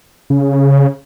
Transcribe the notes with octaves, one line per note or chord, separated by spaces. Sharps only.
C#3